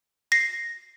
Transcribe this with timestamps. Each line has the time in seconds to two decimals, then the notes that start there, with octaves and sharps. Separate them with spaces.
0.32 A#6 C7